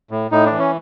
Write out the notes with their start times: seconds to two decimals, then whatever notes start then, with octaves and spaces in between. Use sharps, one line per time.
0.11 A2
0.31 A2 D#4
0.46 D4
0.51 E3
0.59 C#4